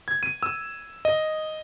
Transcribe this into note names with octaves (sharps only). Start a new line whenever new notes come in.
G#6
D#7
E6
D#5